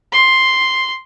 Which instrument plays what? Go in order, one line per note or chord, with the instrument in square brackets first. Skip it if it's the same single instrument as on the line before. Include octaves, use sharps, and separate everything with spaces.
[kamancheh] C6